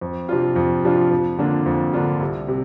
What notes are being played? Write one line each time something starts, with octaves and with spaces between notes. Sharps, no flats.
F2
C3 F3 D4 F4
F2
C3 F3 D4 F4
F2
D3 A#3 D4 F4
F2
D3 A#3 D4 F4
C2
C3